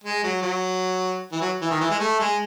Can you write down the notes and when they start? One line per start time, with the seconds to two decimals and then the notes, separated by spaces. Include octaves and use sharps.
0.04 G#3
0.24 F#3
0.42 F#3
1.32 E3
1.41 F#3
1.61 E3
1.71 D#3
1.81 E3
1.90 G#3
2.00 A3
2.20 G#3